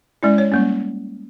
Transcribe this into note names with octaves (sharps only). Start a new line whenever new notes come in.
G#3 C#4 E4 D5
C#5
G3 A#3 C#4